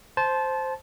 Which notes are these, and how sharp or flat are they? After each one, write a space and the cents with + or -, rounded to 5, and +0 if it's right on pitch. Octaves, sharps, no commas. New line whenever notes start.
C5 +0 A5 -20